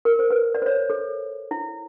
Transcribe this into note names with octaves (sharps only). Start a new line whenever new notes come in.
A#4
C5
B4
D5
C5
C#5
A4
E4